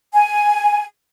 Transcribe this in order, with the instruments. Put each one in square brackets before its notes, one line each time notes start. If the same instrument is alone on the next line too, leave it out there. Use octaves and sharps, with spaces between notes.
[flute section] G#5